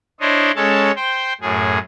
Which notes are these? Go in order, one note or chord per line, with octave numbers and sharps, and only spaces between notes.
D4 E4 C5 C#5 D#5
G#3 C#4 A4 C#5 A5
C5 G5
F#2 A2 G#4